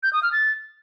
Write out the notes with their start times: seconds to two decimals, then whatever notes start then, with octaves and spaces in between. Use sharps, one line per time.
0.03 G6
0.13 D#6
0.23 F6
0.33 A6